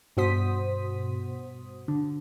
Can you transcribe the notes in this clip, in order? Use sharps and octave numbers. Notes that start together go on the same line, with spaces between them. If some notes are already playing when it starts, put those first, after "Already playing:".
G2 B2 F#4 C5 D#6 B6
D3